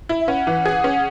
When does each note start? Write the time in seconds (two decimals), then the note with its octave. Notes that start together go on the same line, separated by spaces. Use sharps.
0.09 E4
0.20 E5
0.28 C#4 F#5
0.47 E3
0.65 G#4
0.84 C#4